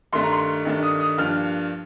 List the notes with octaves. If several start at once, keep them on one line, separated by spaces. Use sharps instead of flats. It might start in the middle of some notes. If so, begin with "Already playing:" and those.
G2 D#3 A3 D4 C6
A#5
C6
G2 D#3 A3 D4
D#6
D#6
G2 F3 A#3 D4 F6